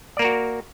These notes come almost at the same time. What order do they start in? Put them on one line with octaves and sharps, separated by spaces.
D5 A#3 A#4 F#4